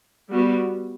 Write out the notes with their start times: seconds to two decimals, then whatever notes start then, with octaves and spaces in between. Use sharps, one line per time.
0.31 G3 B3 F#4